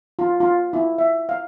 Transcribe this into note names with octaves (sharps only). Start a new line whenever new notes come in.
F4
F4
E4
E5
F5